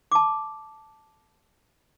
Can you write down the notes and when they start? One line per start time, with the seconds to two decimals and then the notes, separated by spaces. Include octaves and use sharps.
0.12 A5 D6